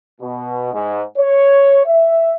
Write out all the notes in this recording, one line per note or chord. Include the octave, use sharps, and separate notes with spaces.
B2
G#2
C#5
E5